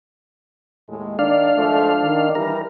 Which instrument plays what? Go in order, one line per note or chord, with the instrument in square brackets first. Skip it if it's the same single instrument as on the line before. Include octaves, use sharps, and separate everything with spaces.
[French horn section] D#2 A2 G#3
[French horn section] D#3 D5 [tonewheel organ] D4 F5
[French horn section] G#2 F3 A3
D#3
[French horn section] E3 G3 E4 [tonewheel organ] A#4